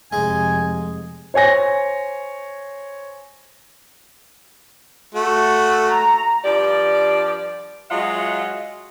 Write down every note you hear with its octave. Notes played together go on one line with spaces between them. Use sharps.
F1 G#3 G#5
C5 C#5 G#5 A#6
A3 F#4
A#5
G2 F3 G4 D5
F#3 G#3 F4 D#5 E5 F#5